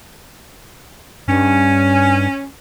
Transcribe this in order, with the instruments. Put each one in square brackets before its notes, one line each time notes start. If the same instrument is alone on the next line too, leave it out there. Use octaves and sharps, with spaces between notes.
[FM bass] G2 [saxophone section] C#4